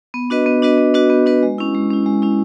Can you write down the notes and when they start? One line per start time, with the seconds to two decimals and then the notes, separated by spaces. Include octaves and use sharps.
0.14 B3
0.30 D4 F#4 B4 D#5
0.46 B3
0.62 D4 F#4 B4 D#5
0.78 B3
0.94 D4 F#4 B4 D#5
1.10 B3
1.26 D4 F#4 B4 D#5
1.43 G#3
1.58 C#4 E4
1.74 G#3
1.90 C#4 E4
2.06 G#3
2.22 C#4 E4